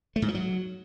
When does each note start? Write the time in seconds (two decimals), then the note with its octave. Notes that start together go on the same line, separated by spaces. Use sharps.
0.16 A3
0.22 G#2
0.28 F3
0.35 F#3